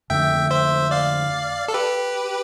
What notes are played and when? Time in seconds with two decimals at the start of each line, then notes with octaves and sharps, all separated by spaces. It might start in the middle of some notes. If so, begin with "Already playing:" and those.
0.10 F2 D3 A3 E5 G5
0.51 C5 E5
0.91 D5 F5
1.68 A4
1.74 G4 B4